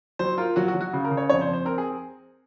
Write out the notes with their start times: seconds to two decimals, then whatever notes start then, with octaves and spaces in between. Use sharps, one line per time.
0.19 F#3 C5
0.38 F4 A#4
0.56 F#3 F#4
0.68 F#4
0.75 F#3
0.81 F#4
0.93 C#3
1.05 A#4
1.11 C#3
1.17 C#5
1.29 F2 C#5
1.41 C5
1.47 F2
1.53 C5
1.65 C4 A#4
1.78 G#4